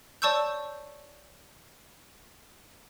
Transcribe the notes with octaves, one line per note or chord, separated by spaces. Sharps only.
C#5 D5 A5 C#6 E6 G6